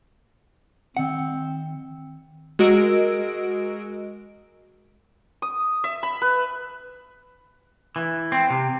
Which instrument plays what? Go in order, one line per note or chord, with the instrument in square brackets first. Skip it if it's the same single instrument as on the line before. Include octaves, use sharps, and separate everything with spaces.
[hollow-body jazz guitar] D#3 F#5 [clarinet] C4
[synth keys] G#3 F#4 A#4 D#5 E6 D7
[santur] D#6
E5
B5
B4
[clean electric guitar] E3
C4
C3